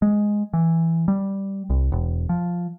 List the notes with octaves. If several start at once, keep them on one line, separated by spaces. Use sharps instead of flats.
G#3
E3
G3
C2
E1
F3